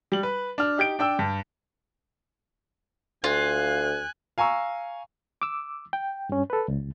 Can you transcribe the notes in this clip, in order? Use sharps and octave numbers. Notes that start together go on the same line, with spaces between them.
G3 F#7
B4
D4 F6
D#4 G4 G6 D7
D4 G5 E6
G2
D2 F4 G#5 F#6
F5 G#5 A#5 C#6 E6
D6 E6
G5
G2 C#4
A4 B4
C#2